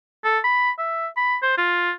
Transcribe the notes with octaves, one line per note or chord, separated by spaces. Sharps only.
A4
B5
E5
B5
C5
F4